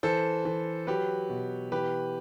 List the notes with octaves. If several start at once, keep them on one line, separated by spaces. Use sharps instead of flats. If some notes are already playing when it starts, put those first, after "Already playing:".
E3 A4 C5
E3
F#3 G4 B4
B2
E3 G4 B4